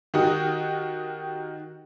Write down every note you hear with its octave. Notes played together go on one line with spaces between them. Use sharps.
D#3 D#4 F#4 G4